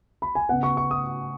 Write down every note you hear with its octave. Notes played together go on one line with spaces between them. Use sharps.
B5
G#5
C#3 B3 F#5
C#6
C#6
D#6